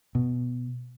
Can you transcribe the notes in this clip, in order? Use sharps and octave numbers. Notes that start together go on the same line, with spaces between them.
B2